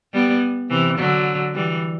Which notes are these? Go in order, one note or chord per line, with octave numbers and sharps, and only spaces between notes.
G3 B3
C3 E3
D3 F#3
E3 G3